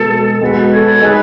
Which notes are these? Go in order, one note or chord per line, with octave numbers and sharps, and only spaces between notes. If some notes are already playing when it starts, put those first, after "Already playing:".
Already playing: B2 G#3 B3 A4
G#3 B3 F#4 B4
A4 C#5
G#3 D#4 G#4 B4